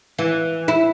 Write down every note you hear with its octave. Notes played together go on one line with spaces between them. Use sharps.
E3
E4